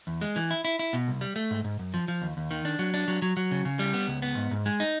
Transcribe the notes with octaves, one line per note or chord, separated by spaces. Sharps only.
E2
G#3
E3
E4
E4
E4
B2
C2
G3
A3
G#2
G#2
F#2
F3
F3
D#2
D#2
D#3
D4
F#3
D4
F#3
F#3
F#3
C#3
C#3
G3
B3
C#2
B3
G#2
G#2
G#3
D#4